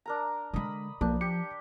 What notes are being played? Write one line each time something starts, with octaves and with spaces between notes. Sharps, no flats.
D4 A#4 A#5
D3 G#3 D#5 B5
B1 F3 A#3 D4
G4 C#7